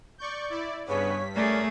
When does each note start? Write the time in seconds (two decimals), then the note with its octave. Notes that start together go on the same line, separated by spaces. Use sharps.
0.18 D5 C#6 G6
0.50 E4 D5
0.88 G2 C#3 B3 C#5 B6
1.36 A3 C#4 G#4 A#4 D5